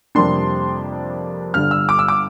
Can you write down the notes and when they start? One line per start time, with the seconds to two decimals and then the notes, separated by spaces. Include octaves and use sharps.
0.15 F2 C3 G3 A#3 D4 C6
1.54 G1 G2 D3 F6
1.71 E6
1.89 D6
1.99 E6
2.08 D6